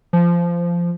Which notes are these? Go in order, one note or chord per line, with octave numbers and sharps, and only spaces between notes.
F3